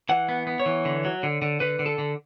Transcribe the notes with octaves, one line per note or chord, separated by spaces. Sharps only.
E3 F#5
B3
B3
C#5
E3
D3
F#3
D3
D3
D3 B4
D3
A4
D3